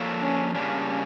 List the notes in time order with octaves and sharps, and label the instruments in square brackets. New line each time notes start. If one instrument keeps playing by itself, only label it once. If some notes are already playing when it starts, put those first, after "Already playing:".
Already playing: [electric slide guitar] F3 A#3 D4 A4 C#5
[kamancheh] C#4
[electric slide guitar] C#3 G3 A#3 D4 [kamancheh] C#4